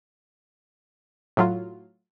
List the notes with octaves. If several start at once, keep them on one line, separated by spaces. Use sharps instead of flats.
A2 F#3 F4